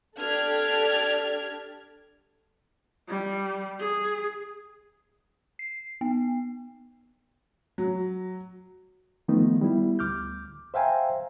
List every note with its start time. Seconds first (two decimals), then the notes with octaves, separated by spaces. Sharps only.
0.18 D4 G4 A4 F6 G#6
3.08 G3
3.79 G#4
5.59 C7
6.01 B3
7.78 F#3
9.28 D#3 F3 A3 B3 D#4
9.61 G3 B3 E4
9.99 D2 D6 F6 G6
10.74 C5 E5 F5 G5 G#5 A#5